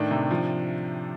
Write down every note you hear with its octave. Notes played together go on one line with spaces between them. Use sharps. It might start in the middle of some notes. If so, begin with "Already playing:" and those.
Already playing: A2 D#3 D4
C3
F3